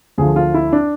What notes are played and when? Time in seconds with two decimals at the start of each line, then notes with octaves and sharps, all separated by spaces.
0.18 D2 D3 F3 G#4
0.36 F4
0.54 E4
0.72 D4